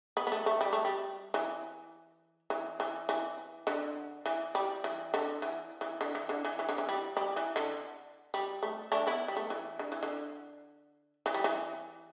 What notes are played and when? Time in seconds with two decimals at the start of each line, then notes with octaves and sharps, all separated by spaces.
0.17 B3
0.27 B3
0.32 A3
0.46 A3
0.61 G3
0.73 A3
0.85 G3
1.34 E3
2.50 E3
2.80 E3
3.09 E3
3.67 D3
4.26 E3
4.55 G3
4.84 E3
5.14 D3
5.42 E3
5.81 E3
6.01 D3
6.15 E3
6.29 D3
6.45 E3
6.59 E3
6.69 D3
6.78 E3
6.89 G3
7.17 G3
7.36 E3
7.56 D3
8.34 G3
8.63 A3
8.92 A3 D4
9.07 B3 E4
9.28 G3
9.37 A3
9.50 E3
9.79 D3
9.92 E3
10.03 D3
11.26 E3
11.34 G3
11.44 E3